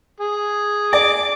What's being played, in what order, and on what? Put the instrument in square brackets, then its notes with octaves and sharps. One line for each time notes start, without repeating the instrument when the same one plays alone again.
[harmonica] G#4
[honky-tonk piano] D5 [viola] D6